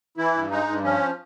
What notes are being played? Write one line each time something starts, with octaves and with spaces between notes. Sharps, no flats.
E3 E4
G2
G#3 D#4
G2
F3 C#4